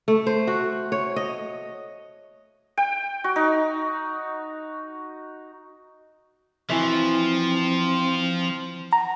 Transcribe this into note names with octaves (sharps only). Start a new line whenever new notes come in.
A3
C5
F#4
C#5
D#5
G5
F#4
D#4
E3 F3 C4 F#4 E5
F#5 A#5